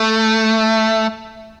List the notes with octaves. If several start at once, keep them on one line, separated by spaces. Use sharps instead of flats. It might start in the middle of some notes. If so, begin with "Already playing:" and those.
Already playing: A3